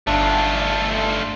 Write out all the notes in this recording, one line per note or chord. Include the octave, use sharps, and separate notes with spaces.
G1 A3 D4 F4